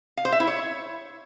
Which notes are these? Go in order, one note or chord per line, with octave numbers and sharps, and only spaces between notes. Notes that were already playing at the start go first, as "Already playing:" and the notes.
F5
C5
E5
E4
C#5